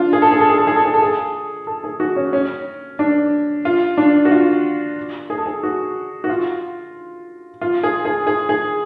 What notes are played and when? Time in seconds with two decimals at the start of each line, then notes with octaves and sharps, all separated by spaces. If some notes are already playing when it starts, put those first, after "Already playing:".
Already playing: D4 F4
0.13 G#4
0.22 A4
0.31 G#4
0.41 A4
0.49 G#4
0.58 A4
0.67 G#4
0.76 A4
0.85 G#4
0.94 A4
1.02 G#4
1.67 A4
1.84 G#4
2.00 F#4
2.16 C#4
2.33 C#4
2.99 D4
3.65 F4
3.97 D4
4.25 F#4
4.31 F4
5.30 G#4
5.38 A4
5.46 G#4
5.63 F#4
6.24 F#4
6.29 F4
7.61 F4
7.83 G#4
8.05 G#4
8.27 G#4
8.49 G#4